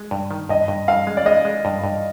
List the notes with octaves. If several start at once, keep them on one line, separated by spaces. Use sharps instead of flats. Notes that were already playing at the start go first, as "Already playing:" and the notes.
Already playing: G#3
G2
D#3
G2 D#5
G2
G2 F5
G#3
D5
G#3 D#5
G#3
G2
G2